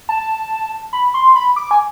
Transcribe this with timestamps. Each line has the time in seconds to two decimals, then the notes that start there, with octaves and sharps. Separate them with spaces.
0.09 A5
0.93 B5
1.14 C6
1.35 B5
1.56 D6
1.71 G#5